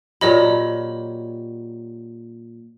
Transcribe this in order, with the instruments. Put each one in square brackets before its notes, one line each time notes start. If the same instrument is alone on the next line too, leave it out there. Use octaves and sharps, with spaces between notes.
[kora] A#2 F#3 G4 [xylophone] C#5 D#5 B5